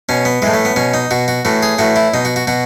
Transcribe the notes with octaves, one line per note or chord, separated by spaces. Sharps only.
B2 C#4
B3
A2 E3 G#3
A3
B3
B2 C#4
D#4
B2 F#4
F#4
A2 E3 F#4
G#4
A2 E3 F#4
E4
B2 D#4
F#4
F#4
B2 F#4